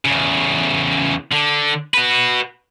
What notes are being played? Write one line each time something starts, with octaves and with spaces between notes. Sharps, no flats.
E2 C#3
D3
F#4 B4